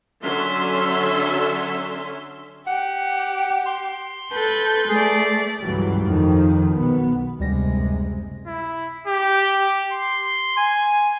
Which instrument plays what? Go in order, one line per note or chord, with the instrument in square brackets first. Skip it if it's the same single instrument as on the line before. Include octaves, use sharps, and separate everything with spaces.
[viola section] D3 F#3 C#4 E5 C6
[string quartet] G4 [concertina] F#5
[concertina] C6
[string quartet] A4 B4 G6
[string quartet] A3 D5 [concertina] G#4
[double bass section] C#2 G2 C#3 E3 F#3 G3
F2 D#3 F3
B1 B3
[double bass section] F#1 C3 G#3 [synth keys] D2 G3 A#6
[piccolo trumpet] E4
G4
C6
G#5